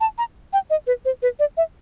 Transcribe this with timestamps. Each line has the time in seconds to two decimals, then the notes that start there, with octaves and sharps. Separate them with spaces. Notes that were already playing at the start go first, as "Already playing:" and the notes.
0.01 A5
0.18 A#5
0.53 G5
0.70 D#5
0.87 B4
1.05 C5
1.22 B4
1.39 D5
1.57 E5